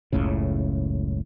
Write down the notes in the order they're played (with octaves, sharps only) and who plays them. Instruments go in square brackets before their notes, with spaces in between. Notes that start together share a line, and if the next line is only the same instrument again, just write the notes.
[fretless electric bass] F#1 C#2 A2 C#3